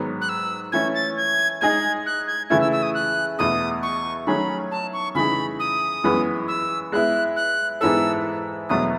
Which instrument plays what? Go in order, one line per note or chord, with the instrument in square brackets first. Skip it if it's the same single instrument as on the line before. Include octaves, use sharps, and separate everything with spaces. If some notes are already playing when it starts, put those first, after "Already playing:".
Already playing: [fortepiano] G#2 D#3 F#3 B3
[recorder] F#6
E6
[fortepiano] E3 A3 C#4 [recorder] G#6
[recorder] A6
G#6
[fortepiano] G#3 D#4 G#4 D#5 [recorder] G#6
[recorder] F#6
G#6
[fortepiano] C#3 E3 A3 E4 [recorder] G#6
[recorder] E6
E6
D#6
F#6
[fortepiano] E2 B2 A3 E4 [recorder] D#6
[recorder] C#6
[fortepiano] D#3 F#3 A3 C#4 G#4 [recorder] B5
[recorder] A5
C#6
[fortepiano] C#3 E3 A3 D#4 G#4 [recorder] B5
[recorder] D#6
[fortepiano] F#2 E3 G#3 B3
[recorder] E6
[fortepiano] G#3 B3 E4 [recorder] F#6
[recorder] F#6
[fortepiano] G#2 E3 B3 E4 A4 [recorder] E6
[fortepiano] E2 B2 F#3 A3 E4 [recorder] D#6